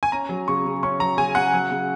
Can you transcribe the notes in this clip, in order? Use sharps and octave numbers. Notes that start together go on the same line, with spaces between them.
G#5
C#4 A#5
F#3
C#3 C#6
C#3
C#4 C#6
F#3 A#5
C#3 G#5
C#3 F#5
F#3
C#3